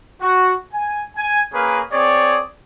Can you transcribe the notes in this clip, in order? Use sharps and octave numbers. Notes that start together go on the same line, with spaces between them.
F#4
G#5
G#5
A#3 C#4 G#4 A#4 B4
C4 G#4 C#5 D5